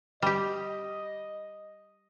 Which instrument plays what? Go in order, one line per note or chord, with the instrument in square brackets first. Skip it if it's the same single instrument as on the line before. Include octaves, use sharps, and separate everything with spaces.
[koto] G3 G4 [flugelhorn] D#5